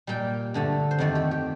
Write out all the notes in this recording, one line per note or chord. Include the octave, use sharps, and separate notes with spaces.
A#2 G3 A#3 G5
G2 D3 A3
C5
F2 D#3 A3 D5
G4
G4